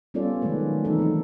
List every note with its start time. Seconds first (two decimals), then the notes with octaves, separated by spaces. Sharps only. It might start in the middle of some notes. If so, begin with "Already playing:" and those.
0.14 G3 B3 C#4 F4 A4 D5
0.42 D#3 F#3 G#3 A3 B4
0.85 E3 C4 D#4 E4 A4
0.99 E3 D#4